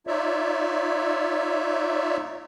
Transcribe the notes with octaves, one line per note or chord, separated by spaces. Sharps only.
D#4 F4 C#5 D5 E5